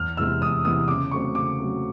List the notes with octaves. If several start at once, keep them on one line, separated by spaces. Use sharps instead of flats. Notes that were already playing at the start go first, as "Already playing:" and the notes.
Already playing: E2 F6
C3 E3 G#3 B3 E6
E2 D#6
C3 E3 G#3 B3 D#6
C#3 D6
F#3 A3 C4 C#6
C#3 D6
F#3 A3 C4